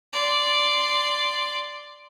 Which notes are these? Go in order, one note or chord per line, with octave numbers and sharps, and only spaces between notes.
D5 C6